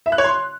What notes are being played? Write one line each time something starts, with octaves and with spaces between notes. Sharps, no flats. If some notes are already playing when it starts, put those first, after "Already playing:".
E5
F#6
C#5
C6